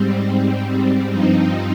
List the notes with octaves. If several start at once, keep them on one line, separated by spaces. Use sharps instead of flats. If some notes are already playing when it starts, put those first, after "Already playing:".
Already playing: G#2 G3 C4
G2 F3 C4 D#4